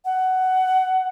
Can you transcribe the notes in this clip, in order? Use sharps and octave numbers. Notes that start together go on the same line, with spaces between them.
F#5